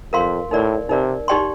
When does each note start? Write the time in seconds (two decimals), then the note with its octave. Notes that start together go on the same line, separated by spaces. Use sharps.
0.13 F2 A#4 F5 C6
0.51 A2 D#4 A#4 D5
0.89 C3 D#4 A#4 D5
1.28 D#4 G4 D5 G5 C6